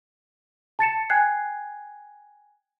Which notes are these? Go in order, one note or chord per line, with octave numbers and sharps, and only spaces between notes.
A5 A6 C#7 E7
G5 G#5 F#6 G#6 C7